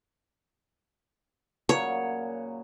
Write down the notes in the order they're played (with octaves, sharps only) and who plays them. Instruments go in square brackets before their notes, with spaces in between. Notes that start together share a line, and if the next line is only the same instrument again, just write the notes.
[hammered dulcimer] A#2 C#3 F#3 [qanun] C#5